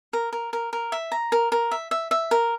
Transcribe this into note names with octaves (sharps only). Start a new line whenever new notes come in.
A#4
A#4
A#4
A#4
E5
A#5
A#4
A#4
E5
E5
E5
A#4